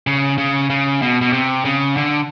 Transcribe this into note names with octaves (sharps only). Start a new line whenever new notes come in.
C#3
C#3
C#3
B2
B2
C3
C#3
D3